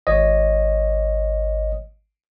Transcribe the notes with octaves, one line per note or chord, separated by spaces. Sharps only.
G#1 C#5 D#5